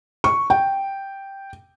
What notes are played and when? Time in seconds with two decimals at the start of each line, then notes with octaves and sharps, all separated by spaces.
0.24 C#6
0.50 G5